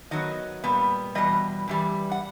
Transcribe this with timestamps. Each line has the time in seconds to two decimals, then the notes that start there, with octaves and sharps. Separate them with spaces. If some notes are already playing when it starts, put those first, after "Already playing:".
0.11 D#3 F#3 B3 D#5
0.64 A#2 G3 B3
1.15 E2 B2 G3 D#5
1.68 G2 E3 G3
2.12 F#5